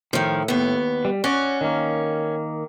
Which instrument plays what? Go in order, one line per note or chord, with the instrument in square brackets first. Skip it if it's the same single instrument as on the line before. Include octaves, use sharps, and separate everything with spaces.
[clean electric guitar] A2 [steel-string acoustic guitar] D#3 F3
[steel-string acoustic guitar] D#2 B3
[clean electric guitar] G3
[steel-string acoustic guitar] C#4 [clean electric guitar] F#4 D5
[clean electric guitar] D#3 A#3